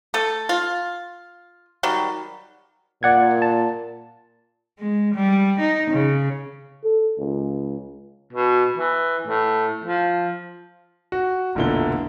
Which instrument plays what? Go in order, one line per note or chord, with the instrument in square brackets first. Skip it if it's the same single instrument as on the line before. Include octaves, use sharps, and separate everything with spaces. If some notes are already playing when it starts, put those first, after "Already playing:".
[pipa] A3 A4
F4
D#3 F#3 G3
[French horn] A#2 [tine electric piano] D5 F#5 G#6
[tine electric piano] A5
[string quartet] G#3
G3
D#4
C#3
[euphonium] A4
C#2
[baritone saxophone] B2
E3
A2
F3
[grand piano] F#4
F1 B1 A#2 D3 E4 G7